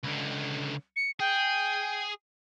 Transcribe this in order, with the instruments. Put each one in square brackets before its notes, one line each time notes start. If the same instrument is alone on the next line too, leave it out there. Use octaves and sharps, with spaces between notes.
[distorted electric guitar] C#2 D3
[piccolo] C#7
[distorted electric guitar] G#4 [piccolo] G5